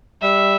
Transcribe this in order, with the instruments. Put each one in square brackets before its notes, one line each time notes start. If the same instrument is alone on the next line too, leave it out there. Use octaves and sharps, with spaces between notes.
[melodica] G3 [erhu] E5